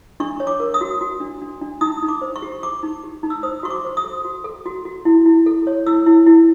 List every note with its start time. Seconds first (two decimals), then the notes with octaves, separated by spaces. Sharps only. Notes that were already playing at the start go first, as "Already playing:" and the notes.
0.20 D4 C#6
0.40 C#5
0.47 D6
0.60 A#4
0.74 D#6
0.81 F#4
1.01 F#4
1.20 D4
1.42 D4
1.61 D4
1.81 D#4 D#6
2.02 D#4
2.08 D6
2.21 C5
2.36 C#6
2.42 G4
2.62 G4 D6
2.83 D#4
3.04 G4
3.23 D#4
3.30 E6
3.43 C5 D#6
3.63 F#4 C#6
3.70 D6
3.85 C5
3.97 D#6
4.04 A4
4.25 F#4
4.44 A4
4.66 F#4
4.85 F#4
5.05 E4
5.26 E4
5.46 A4
5.67 C#5
5.86 E4 E6
6.06 E4
6.27 E4